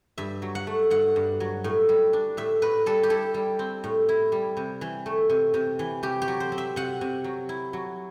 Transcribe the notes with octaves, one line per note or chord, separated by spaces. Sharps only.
G2 E5
F#3
F#5
A3
G2 F#5
G2
F#3
A2
G3
D4
A2 E5
A2 B4
G3 A4
G4
E4 A4
G3
C4
A2
E4
G3
C3
E3
A3
C3
C3
E3
C3 G4
G4
F#3
C5
C4
E5
C3 F#5
C3
F#3
E4
F#3